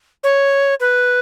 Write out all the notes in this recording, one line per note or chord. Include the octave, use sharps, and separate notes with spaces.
C#5
B4